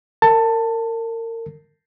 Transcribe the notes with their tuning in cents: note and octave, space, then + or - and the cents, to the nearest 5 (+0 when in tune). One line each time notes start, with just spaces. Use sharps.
A#4 -30 A5 +15